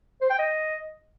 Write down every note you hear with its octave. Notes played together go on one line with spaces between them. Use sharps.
C5
G5
D#5